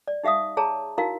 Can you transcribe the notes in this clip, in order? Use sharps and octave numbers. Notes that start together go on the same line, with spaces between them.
D5
D#4 G4 E5 F5 D#6
G#4 C#5 A5 A#5
D#4 E4 F#4 A#4 F5